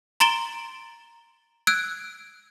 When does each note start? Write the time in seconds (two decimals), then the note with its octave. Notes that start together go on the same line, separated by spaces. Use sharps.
0.20 A#5 C6 A6 D7 E7 G7
1.67 E6 F#6 G#6 D7